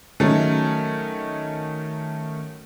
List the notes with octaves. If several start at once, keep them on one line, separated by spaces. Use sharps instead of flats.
D#3 F#3 A3 C#4 D#4